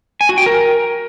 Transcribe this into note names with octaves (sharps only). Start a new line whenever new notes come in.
G#5
F#4
G5
A#4